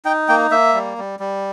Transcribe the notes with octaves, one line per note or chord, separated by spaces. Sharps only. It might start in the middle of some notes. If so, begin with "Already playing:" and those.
D#4 G5
A#3 G5
A#3 E5
G3
G3
G3